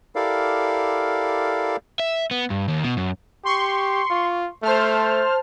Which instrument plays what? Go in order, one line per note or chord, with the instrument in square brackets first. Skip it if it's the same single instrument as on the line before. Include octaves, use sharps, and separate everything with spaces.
[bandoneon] E4 G4 A4 A#4 D5 F5
[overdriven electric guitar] E5
B3
G2
D#2
B2
F#2
[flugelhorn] G4 [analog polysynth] C6 C#6
[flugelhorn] F4
[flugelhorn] A3 [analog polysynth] C5 A5 F6